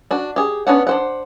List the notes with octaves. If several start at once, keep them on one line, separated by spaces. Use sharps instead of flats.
D4 F#4
G4 G#4
B3 C#4 D4 F#5
D4 C5 F#5